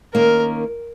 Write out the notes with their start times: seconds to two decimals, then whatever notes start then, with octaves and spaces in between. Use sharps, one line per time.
0.14 D#3 A#3 C#4 A#4